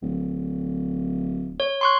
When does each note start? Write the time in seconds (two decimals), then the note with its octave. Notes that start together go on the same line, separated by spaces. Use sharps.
0.02 D1
1.60 C#5
1.81 C6 C#6 F#6